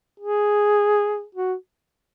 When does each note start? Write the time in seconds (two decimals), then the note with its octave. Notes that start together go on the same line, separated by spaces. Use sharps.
0.20 G#4
1.35 F#4